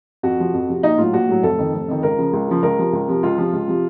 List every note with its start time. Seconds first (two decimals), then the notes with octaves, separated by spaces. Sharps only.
0.23 F2 F#4
0.38 C3 F3
0.53 F2
0.68 C3 F3
0.83 A#1 D#4
0.98 A2 F#3 F4
1.13 A#1 F#4
1.29 A2 F#3
1.43 F1 A4
1.58 F2 D#3
1.73 F1
1.88 F2 D#3
2.03 C#2 A#4
2.18 C#3 F3
2.33 C#2
2.48 C#3 F3
2.63 C#2 A#4
2.79 C3 F3
2.93 C#2
3.08 C3 F3
3.23 C#2 F4
3.38 C3 F3
3.53 C#2
3.68 C3 F3